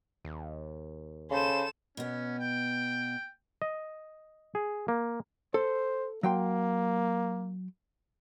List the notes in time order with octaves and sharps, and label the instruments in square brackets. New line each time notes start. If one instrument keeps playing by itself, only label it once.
[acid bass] D#2
[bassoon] C#3 [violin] A4 E7 [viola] C5
[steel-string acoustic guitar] B2 B3 [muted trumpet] C#4
[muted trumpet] G5
[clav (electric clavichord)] D#5
G#4
A#3
[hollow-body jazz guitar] A4 [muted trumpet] C5
[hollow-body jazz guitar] F#3 G5 C6 [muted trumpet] A#3